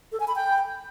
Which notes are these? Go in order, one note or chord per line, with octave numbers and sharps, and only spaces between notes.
A4
G#5
B5
G5